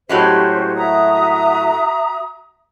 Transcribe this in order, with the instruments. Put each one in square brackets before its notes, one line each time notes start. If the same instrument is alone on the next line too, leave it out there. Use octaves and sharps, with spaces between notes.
[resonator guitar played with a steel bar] A2 F#3 G#3 [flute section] C#4 G4 C5
[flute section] F#4 E5 D#6 [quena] A#5